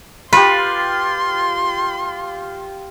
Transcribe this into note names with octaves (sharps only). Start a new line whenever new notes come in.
F4 G4 B4 C6